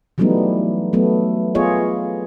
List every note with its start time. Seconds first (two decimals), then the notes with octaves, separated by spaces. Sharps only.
0.18 E3 F#3 G3 A3 B3 D#4
0.93 F#3 A3 B3
1.55 B3 F4 G#4 C#5 D#5